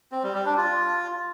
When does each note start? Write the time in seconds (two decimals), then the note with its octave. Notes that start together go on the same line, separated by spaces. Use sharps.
0.12 C4
0.23 G3
0.35 G3
0.46 D4
0.57 F4